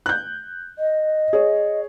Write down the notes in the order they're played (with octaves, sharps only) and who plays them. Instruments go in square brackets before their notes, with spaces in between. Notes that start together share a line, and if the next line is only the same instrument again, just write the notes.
[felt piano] F#6 G6
[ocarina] D#5
[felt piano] G#4 C#5